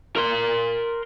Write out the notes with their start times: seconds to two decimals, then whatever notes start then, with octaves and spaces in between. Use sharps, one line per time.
0.16 A#4 C6